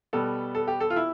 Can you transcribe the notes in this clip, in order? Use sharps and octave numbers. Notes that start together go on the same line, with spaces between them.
B2 G3 B3 A4
A4
G4
A4
F4
E4